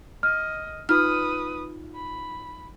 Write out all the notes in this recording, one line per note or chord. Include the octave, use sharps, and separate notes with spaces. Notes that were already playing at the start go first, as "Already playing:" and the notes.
D#5 F6
D#4 F4 B4 D#6 F6
B5